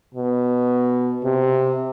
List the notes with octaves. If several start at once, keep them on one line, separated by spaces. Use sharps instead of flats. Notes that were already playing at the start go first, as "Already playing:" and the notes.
B2
C3